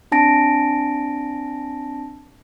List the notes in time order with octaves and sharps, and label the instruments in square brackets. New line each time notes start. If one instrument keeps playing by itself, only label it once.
[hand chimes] C4 D4 A5 A#6 D7